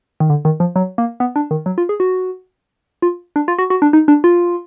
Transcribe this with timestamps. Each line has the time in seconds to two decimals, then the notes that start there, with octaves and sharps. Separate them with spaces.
0.20 D#3
0.30 D3
0.45 D#3
0.60 F3
0.76 F#3
0.98 A#3
1.20 B3
1.36 D4
1.51 D#3
1.66 F#3
1.78 F4
1.89 G#4
2.00 F#4
3.02 F4
3.36 D4
3.48 F4
3.58 F#4
3.70 F#4
3.82 D4
3.93 D#4
4.08 D4
4.24 F4